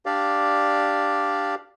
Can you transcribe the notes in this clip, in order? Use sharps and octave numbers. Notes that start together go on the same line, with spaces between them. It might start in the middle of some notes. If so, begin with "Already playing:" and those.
D4 G4 D5 F5